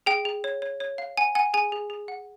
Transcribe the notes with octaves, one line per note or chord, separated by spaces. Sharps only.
G#4 G5
G#4
C#5
C#5
C#5
F5
F#5 G#5
F#5 G#5
G#4 G#5
G#4
G#4
F#5